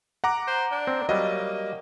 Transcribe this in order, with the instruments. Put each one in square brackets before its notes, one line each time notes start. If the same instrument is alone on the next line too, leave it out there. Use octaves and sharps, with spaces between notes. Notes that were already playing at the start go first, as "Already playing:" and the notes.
[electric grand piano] F#5 A#5 D6
[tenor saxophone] C5
D4
[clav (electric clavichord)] C4
[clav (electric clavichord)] F#3 G3 [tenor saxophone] A#3 [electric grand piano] D#5